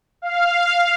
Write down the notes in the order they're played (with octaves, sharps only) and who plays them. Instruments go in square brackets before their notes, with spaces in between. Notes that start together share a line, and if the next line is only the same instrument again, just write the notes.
[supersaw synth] F5